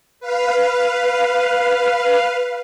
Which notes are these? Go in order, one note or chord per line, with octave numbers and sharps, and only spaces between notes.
B4 F5